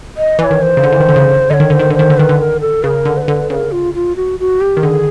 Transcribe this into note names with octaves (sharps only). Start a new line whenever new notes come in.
D#5
E3 D#5
C#5
D#3
C5
C#3
D3
E3
D#3
D3
C#3
D3 C#5 D#5
D#3
D3 C5
D#3
D3 C5
D#3
D3
D#3 B4
D3
B4
A#4
A4
C#3 A#4 B4
D3
C5
B4
D3
C#3 A#4 B4
F4
F4
F#4
F#4
G4
D#3
D3 G#4